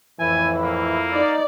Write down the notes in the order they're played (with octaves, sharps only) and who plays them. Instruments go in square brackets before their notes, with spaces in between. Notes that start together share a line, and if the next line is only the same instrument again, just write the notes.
[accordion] F2 E4 [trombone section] A2 E3 [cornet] G#5
[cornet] A#3
[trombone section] D#4 [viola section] D5